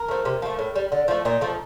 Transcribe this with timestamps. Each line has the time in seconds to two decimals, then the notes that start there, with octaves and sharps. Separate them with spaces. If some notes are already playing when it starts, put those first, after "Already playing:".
Already playing: A#4
0.08 F3 A3
0.25 C3
0.42 F3 A3
0.59 A2
0.75 G3
0.92 D3
1.08 F3 A3
1.25 A#2 D#4
1.41 F3 A3